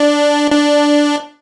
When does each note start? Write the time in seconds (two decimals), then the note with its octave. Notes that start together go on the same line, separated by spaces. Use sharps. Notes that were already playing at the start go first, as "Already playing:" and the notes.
Already playing: D4
0.51 D4